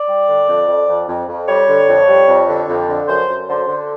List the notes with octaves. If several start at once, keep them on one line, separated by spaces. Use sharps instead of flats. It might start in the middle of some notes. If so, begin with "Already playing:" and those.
Already playing: D5
G3
D3
F2
F2
F2
F2
F2
G3 C#5
D3
F2
G3
F2
D3
F2
D3
F#2 C5
F#2
D3 C5
D3